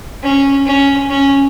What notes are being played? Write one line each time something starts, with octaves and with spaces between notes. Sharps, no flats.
C#4
C#4
C#4